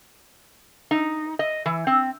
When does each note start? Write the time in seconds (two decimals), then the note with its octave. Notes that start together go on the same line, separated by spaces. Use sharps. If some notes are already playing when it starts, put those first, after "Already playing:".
0.91 D#4
1.39 D#5
1.66 E3
1.87 C4